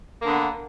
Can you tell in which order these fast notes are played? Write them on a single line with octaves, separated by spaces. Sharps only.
A#3 D3 B3